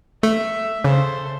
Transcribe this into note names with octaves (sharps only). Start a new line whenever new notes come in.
A3 E5
C#3 A4 C5